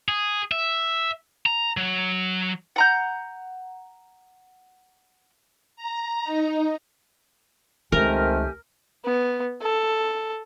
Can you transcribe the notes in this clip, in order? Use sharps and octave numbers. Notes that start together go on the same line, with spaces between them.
G#4
E5
A#5
F#3
F#5 A#5 G6
A#5
D#4
C#2 D#3 A3 C4 G4 A#4 G#5 F6
B3
A4